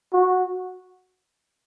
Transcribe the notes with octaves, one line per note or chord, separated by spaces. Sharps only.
F#4